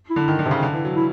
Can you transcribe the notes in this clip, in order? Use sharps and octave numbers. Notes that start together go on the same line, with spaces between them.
E4
D3
D#3
D3
C3
C#3
D3
E3
F#3
E4